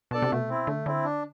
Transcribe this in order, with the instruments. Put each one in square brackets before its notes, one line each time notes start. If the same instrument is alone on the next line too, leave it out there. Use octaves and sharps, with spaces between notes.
[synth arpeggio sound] B2 [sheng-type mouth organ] D4 A4 D5 A5
[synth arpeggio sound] C3
[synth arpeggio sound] B2 [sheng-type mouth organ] A3
[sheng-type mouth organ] C4 E4
[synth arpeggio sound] D3 [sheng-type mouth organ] A3
[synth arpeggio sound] D3 [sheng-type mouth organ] C4 E4
[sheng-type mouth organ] D4